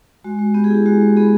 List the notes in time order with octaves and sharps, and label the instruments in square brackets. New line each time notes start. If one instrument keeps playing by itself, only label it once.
[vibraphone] G#3 F#4
G#3
B3 G4
G#4
E4 G4
G#3 F#4
G#3
B3 G#4